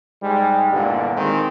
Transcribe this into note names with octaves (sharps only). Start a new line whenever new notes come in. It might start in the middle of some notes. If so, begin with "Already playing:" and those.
G#2 G3 G#3
E2 G2 A#2 D3
D#3 G#3 C4